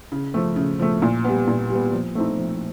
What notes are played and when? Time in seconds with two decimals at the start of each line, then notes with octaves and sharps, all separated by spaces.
0.12 C#3
0.34 F3 A3
0.56 C#3
0.79 F3 A3
1.02 A#2
1.24 G3 B3
1.48 A#2
1.70 G3 B3
1.93 F3
2.15 A3 C4 D#4
2.38 F3